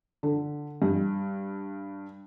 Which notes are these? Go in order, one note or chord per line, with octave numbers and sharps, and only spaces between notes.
D3
G2